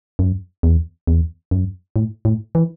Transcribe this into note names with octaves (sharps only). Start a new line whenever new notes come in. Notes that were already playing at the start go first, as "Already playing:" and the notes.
F#2
E2
E2
F#2
A2
A2
E3